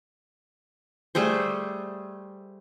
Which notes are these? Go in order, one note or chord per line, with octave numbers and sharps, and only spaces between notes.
G3 A3 G#4 C5